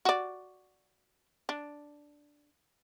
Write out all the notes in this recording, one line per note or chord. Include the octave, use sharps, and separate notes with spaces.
F#4 D5
D4